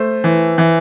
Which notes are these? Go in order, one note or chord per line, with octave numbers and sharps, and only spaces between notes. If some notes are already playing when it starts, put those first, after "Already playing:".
Already playing: A3 C5
E3
E3